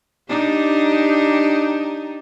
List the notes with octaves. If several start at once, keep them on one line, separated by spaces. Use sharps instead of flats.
D4 D#4 G4